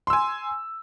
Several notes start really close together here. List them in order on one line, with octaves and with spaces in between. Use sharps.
C6 E6 G#5